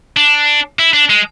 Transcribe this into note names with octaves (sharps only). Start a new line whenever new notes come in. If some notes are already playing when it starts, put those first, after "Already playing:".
D4
E4
D4
G#3